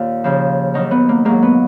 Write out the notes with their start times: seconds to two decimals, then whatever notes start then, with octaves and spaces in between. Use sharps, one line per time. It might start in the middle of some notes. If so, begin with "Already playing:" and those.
Already playing: D#2 A#2 F4
0.24 D#2 C#3 F3
0.74 D#2 D#3 F#3 D#4
0.91 B3
1.09 A#3
1.25 G#2 F#3 A#3
1.42 B3